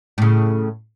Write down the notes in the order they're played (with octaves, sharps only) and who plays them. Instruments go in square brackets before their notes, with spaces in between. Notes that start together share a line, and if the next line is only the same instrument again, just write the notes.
[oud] A2 C#3